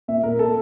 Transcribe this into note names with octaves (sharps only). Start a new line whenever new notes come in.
A#2 E5
A#2 A#4
A#2 A4